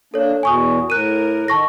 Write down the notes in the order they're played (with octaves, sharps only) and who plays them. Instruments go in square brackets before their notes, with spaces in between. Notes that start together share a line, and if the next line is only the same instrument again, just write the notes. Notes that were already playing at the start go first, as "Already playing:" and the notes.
[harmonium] A#3 D4 [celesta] A4 C#5
[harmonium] E2 B2 [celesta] G#5 C#6 D#6
[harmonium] A2 A#4 [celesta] F#6 D#7
[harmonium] D#3 [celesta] A5 C#6 A#6